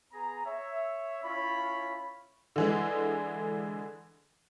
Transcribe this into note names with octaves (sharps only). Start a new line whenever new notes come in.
B3 G#4 A#5
C#5 E5
C#4 E4 F4 C#5 B5
D3 E3 G#3